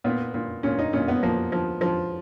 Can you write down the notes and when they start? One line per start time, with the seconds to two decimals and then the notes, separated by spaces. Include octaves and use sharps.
0.04 A#2 B3
0.34 A#2
0.63 A#2 C#4
0.79 D#4
0.93 A#2 C#4
1.08 B3
1.23 F3 A#3
1.52 F3
1.81 F3